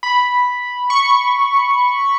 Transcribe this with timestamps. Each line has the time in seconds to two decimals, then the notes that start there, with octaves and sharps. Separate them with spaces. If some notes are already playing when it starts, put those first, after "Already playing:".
0.03 B5
0.90 C#6